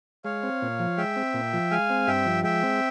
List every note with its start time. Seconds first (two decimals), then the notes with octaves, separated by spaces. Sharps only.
0.25 G#3 C#5 F5
0.43 C4
0.62 A#2
0.79 F3
0.98 G#3 E5 G5
1.16 C4
1.34 A#2
1.53 F3
1.71 G#3 F5 G#5
1.90 C4
2.07 G2 E5 G5
2.26 F3
2.43 G#3 E5 G5
2.63 C4